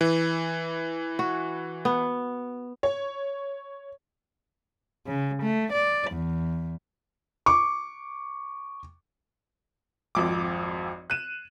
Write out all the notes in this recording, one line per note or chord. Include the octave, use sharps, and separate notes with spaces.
E3
F#4
B3
C#5
C#3
A3
D5
E2
C#6 D6
G#1 F2 D6
F#6 D#7 E7